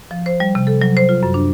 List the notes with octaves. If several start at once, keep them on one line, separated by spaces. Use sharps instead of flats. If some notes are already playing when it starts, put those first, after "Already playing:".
F3
C5
G3
C3
A4
F#3
C5
F4
F#2
D4